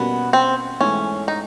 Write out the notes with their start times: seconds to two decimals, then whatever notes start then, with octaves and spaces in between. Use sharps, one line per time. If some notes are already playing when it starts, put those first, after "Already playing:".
Already playing: B2 G3 A#3 B3 C#4 F#4
0.33 C4
0.81 G#2 E3 A3 C#4
1.28 D#4